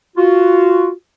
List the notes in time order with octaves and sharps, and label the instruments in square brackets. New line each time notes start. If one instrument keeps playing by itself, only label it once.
[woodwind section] F4 F#4